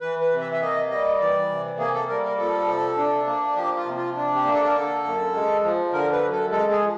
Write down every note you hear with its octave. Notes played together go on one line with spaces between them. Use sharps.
E3 B4
B4
C3
E5
E5
A#3 D#5
G3 D#5
E3 D5
C3
A#3 G#4
A4
G3 A#4
A#4
F3 A4
C3
D4
A#3
F3 G4
F4
C3
F4
D4
G4
A#3
A4
A#4
D3 A4
F#2
G#3
F3
D3 A#4
B4
F#2
A4
G#3 A4
G#4
F3